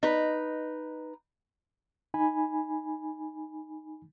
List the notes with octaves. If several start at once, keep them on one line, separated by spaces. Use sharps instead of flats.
D#4 B4
D#4 G#5 B5